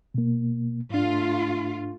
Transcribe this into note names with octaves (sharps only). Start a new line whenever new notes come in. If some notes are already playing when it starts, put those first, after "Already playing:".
B2 A#3
G#2 A3 D4 F4